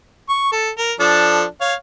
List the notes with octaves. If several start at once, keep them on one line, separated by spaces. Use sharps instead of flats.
C#6
A4
A#4
F3 D4 A4
C#5 F5